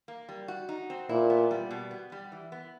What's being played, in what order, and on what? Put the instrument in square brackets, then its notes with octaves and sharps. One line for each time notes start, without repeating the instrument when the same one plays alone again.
[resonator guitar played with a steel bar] A#3
G3
F#4
D#4
C4
[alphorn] A#2 [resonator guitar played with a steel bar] E4
[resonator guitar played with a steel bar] B3
G3
B2
B3
G3
E3
B3